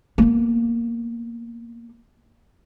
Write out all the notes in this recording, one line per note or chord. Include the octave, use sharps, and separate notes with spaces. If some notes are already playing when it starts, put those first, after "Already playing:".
A#3 B3